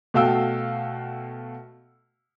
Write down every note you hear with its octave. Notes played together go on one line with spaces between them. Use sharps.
B2 A3 F#4 F5 G5 E6